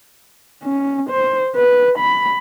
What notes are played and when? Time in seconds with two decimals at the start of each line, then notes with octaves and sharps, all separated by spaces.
0.63 C#4
1.10 C5
1.56 B4
1.98 B5